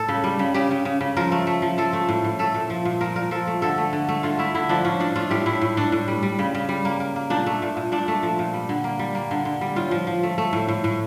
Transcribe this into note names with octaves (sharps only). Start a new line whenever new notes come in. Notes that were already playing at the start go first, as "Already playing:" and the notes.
Already playing: A2 A4
C#3
G3
C#3
C#3 G4
C#3
C#3
C#3
F3 A#4
A3
A3
F3
F3 A4
A3
A2
A2
A3 A4
A#2
F3
A#2
F3 A#4
A#2 A#4
F3 A4
A3
D3 A4
A3
D3
A3
D3 F4
A3 E4
D3 E4
F3 D4
A2 C#4
A2 D4
A3 F4
A2 G4
A2 E4
A2
A2 D4
A2
G3
G3
C#3
C#3
G3
A#3
A#3
A#3
A#2 D4
A3
A#2
A#2
A#2 D4
A3
F3
A#2
G3
D3
A#3
G3
A#3
D3
D3
G3
A2 F4
F3
F3
A3
A3
A2
A2
A2